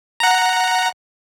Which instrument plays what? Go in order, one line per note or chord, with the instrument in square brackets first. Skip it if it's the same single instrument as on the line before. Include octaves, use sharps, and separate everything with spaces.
[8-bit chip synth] F#5 A#5